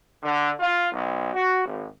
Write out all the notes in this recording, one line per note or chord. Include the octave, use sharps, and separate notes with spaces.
D3
F4
B1
F#4
G#1